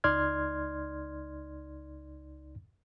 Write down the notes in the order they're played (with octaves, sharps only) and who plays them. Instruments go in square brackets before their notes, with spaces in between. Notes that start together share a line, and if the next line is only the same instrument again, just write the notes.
[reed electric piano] C#2 D#4 D5 C6 F6 G#6